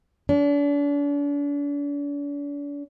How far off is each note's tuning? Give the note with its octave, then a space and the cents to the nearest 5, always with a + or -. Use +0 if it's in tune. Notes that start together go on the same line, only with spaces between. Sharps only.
D4 -40